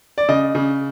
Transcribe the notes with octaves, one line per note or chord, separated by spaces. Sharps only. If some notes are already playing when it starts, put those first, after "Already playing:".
D5
C#3 D#5
C#3